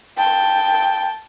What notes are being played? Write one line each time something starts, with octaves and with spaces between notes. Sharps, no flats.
G5 A5